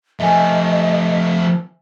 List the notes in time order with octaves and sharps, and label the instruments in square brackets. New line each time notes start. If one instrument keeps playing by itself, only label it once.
[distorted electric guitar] F3 A3 [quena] D#5 [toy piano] E5 G#5